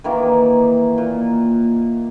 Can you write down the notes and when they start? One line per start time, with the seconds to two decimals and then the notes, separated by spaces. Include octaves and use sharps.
0.04 D#3 E3 A#3
0.98 A#2